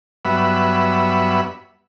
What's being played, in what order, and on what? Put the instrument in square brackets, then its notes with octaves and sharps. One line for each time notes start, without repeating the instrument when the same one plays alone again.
[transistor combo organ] G2 F#3 B3 E5 B5